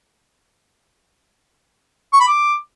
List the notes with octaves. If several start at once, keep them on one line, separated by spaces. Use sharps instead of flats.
C#6
B5
D6